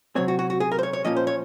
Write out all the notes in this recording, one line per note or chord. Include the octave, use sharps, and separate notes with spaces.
C3 F#3 C4 C#5
F#4
F#4
F#4
G#4
A#4
C5
C#5
C#5
A#2 F3 A#3 C#4 D#5
C5
C#5